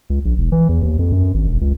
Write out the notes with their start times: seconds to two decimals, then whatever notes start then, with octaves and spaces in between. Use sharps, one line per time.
0.10 C#2
0.25 A#1
0.38 E1
0.52 E3
0.69 E2
0.83 D#2
0.99 F2
1.12 F#2
1.34 G#1
1.48 E1
1.61 C#2